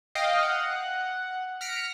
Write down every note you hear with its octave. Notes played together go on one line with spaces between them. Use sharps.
D#5 F5 G5
F#5
F6 A#6 B6 C#7 D7